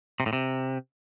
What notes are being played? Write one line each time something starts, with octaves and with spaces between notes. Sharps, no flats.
C3
A2
C3